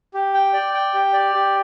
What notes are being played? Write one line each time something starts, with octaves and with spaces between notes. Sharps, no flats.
G4
G5
D5
G5
G4
D5
G4